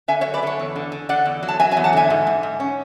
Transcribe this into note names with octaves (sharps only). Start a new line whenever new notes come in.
D3 E5 G#5
C#5 E5
F#3
B4 D5
D3 A4 C#5
E2
D3
D3
D3 D5 F#5
E2
F#3
A5
F#3 E5 G#5
E5 G#5
E2
F#5 A5
D3 E5 G#5
G#2
G#2
G#2
C#4